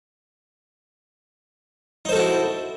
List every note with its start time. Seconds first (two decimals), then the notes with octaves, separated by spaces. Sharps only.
2.05 D#4
2.09 C5
2.12 A4
2.16 F#4
2.19 E4